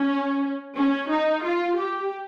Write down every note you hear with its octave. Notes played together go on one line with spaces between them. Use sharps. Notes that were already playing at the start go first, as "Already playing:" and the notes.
Already playing: C#4
C#4
D#4
F4
G4